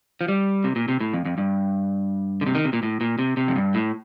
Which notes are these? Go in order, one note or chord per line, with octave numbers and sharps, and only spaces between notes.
F3
G3
C3
A#2
C3
A2
F2
F2
G2
D3
C3
D#3
C3
A#2
A2
A#2
C3
C3
F2
G2
A2